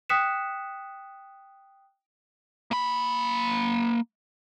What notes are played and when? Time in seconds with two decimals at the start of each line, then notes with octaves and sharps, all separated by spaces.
0.09 G5 D#6 F#6 B6 C#7 E7
2.71 A#3 B5